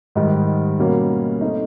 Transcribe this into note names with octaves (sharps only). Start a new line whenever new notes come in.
G#2 D#3 G3
B2 G3 A#3 C#4
A3 C4 D#4